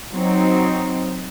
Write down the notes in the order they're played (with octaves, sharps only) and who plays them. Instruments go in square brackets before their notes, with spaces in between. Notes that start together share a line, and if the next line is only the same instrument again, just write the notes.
[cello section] F#3 C4 D#4